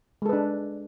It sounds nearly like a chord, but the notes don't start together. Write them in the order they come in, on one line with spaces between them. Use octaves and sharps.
G#3 A4 B4 D4